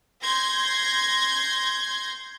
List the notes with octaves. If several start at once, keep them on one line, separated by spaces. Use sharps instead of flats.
C6 G6 G#6 A#6